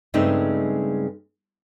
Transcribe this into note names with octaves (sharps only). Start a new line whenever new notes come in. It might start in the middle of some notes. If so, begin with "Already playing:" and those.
G2 C#3 G#3 A3 C4 D#4